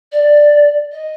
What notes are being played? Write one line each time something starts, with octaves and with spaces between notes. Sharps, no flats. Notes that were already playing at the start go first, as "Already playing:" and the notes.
D5
D#5